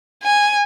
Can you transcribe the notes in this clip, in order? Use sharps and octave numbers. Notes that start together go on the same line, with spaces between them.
G#5